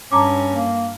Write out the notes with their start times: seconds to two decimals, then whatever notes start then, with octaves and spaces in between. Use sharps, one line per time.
0.11 G2 C#4 A5 A#5 D6
0.53 A#3